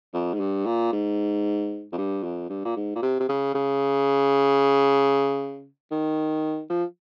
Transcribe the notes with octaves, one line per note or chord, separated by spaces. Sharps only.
F2
G#2
G2
A#2
G#2
F2
G2
F2
G2
A#2
G#2
A#2
C3
C3
C#3
C#3
D#3
F3